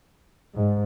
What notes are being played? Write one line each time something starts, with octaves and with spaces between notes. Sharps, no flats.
G#2